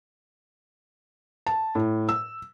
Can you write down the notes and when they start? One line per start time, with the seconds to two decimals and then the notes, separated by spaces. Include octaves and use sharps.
1.47 A5
1.75 A2
2.09 E6